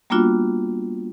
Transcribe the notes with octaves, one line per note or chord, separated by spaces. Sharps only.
G3 A#3 B3 D4 F4 F#4